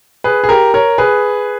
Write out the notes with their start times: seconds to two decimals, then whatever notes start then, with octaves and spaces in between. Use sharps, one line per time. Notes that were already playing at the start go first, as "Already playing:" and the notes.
0.24 G#4 B4
0.44 G#4
0.49 G4 A#4
0.74 A#4 C#5
0.98 G#4 B4